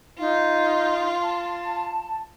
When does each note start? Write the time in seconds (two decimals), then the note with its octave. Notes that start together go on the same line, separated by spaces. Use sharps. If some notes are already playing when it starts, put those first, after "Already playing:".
0.19 D#4 F4
1.23 A5